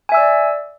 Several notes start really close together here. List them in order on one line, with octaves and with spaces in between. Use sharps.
G#5 E5 E6 D5